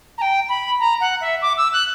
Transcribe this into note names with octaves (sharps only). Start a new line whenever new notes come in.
A#5
G5
B5
A#5
F#5
E5
D6
E6
F#6